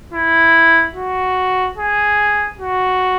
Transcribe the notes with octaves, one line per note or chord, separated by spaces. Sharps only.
E4
F#4
G#4
F#4